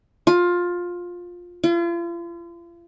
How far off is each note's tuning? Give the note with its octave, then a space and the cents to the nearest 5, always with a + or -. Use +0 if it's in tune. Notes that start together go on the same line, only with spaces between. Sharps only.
F4 +15
F4 -40